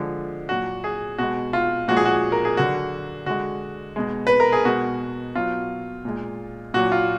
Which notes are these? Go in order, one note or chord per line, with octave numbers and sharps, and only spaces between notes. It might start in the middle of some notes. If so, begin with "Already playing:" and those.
Already playing: D3 F3 G#3
A#2 F#3 F#4
G#4
B2 G#3 F#4
F4
A#2 F3 G#3 F#4
G#4
F#4
A#4
G#4
D3 F#3 F#4
D3 G#3 F#4
B2 G#3
B4
A#4
G#4
B2 G#3 F#4
B2 F#3 F4
A#2 G#3
A#2 F#3 F#4
F4